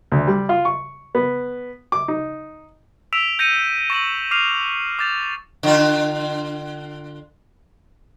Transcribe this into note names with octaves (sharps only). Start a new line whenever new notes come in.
D2
G3
F4
C#6
B3
D6
D#4
E6 B6 D7 E7 F7
G6 A#6 C#7 D#7
C#6 A#6 D#7 F#7
D6 F6 C7 D#7 F7
D6 G6 A6 E7 F7
D3 F4